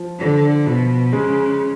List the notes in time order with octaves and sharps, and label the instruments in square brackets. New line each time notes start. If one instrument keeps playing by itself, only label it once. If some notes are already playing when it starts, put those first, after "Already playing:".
Already playing: [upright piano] F3
[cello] D3 [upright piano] F3
[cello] B2 [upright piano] F3
[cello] C#3 [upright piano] G#3